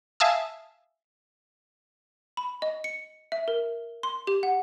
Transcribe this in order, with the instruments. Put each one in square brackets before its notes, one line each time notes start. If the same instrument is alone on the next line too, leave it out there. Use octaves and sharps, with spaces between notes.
[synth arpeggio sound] E5 F5 G#5 A5 D#6 E6
[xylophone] B5
D#5
C#7
E5
A#4
C6
G4
F#5